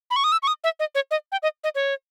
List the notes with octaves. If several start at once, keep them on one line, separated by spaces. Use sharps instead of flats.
B5
C#6
D#6
E6
C#6
D#6
E5
D#5
C#5
D#5
G5
D#5
D#5
C#5